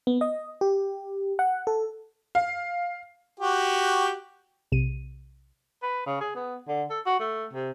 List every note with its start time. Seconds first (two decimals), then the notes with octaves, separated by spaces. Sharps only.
0.07 B3
0.21 D#5
0.61 G4
1.39 F#5
1.67 A4
2.35 F5
3.40 F#4 G4
4.72 B1 C3 D#7
5.83 B4
6.06 C#3
6.21 G#4
6.35 B3
6.68 D3
6.90 A4
7.06 F#4
7.20 A3
7.53 C3